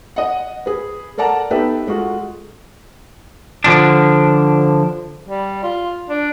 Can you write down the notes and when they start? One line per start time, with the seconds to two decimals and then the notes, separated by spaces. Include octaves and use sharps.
0.16 D#5 F#5
0.66 G#4 B4
1.18 A4 A#4 D5 F#5 A5 A#5
1.50 B3 D#4 G4 A4 B4 E5
1.87 G#3 F4 F#4 A4
3.64 D3 F3 D4
5.26 G3
5.63 F4
6.10 D4